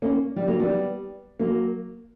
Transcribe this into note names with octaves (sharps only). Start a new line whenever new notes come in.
A#3 C#4
G3
F#3 A#3
G3 B3
F#3 A#3